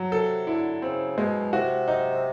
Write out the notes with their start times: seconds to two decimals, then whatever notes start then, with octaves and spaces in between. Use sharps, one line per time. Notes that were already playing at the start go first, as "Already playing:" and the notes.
Already playing: F#3
0.12 C3 A4
0.47 D3 E4
0.82 C#3 C4
1.17 B2 G#3
1.53 C3 F#4
1.88 D#4